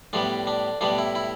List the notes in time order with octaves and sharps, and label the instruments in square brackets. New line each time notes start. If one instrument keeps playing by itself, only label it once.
[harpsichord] A2 G3 B3 D4
D4
A2 G3 B3 D4
E4
E4